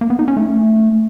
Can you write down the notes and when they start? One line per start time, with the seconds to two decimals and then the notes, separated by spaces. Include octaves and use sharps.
0.01 A#3
0.10 B3
0.19 D#4
0.28 C#4
0.37 A3